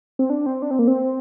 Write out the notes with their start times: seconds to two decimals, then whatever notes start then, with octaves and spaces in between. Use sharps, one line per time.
0.19 C4
0.30 D4
0.46 C4
0.62 D4
0.71 C4
0.79 A#3
0.88 C4